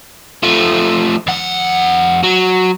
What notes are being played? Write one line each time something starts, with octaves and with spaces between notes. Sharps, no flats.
F3 A3
F2 F#5
F#3